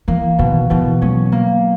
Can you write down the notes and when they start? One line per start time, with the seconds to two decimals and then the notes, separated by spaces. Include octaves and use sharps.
0.08 E3 A#3
0.39 B2 D#3
0.70 B2 E3
1.02 F#3 C#4
1.32 A#3